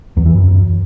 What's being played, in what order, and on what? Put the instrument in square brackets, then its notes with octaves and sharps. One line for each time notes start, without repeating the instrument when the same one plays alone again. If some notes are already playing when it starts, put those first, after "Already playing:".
[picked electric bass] E2
E3
F#2